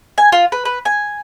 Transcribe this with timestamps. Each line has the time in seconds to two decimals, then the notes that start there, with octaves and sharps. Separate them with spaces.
0.18 G#5
0.32 F4
0.52 B4
0.65 B4
0.85 G#5